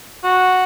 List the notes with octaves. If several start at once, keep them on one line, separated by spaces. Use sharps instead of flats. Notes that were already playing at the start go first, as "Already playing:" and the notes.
F#4